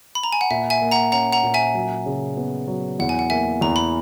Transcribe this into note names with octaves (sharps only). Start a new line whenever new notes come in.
B5
A#5
G#5
F#5
A#2 E5
E5 G#5
A#3
F#5 A#5
C#4 F#5 A#5
F#5 A#5
A#2
E5 G#5
F#3
C#3
B3
F#3
E2 F#5
G#5
F#5
A#3 E5 G#5
E2 A#5
B5